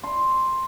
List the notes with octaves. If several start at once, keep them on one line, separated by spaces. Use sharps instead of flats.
C6